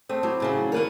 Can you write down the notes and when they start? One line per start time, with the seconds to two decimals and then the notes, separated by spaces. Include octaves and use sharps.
0.09 A3 C4 F5 D#6
0.23 F#3 E4 G4
0.40 A2 C#3 F#3 E5
0.55 C#4 D#4 A6
0.72 D#2 A#3 A#4 B4 C#5